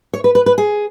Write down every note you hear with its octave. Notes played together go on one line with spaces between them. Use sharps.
C#5
B4
B4
B4
G#4